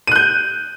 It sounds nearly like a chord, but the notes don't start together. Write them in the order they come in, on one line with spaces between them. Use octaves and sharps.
D#7 F#6 G6